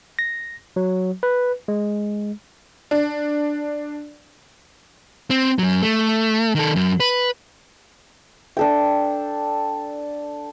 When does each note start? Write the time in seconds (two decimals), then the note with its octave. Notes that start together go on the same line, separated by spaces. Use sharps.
0.19 A#6
0.76 F#3
1.23 B4
1.68 G#3
2.91 D4
5.30 C4
5.59 F#2 F#3
5.82 A3
6.55 D#3 A4
6.76 F#2 F#3
7.00 B4
8.57 D4 A4 G5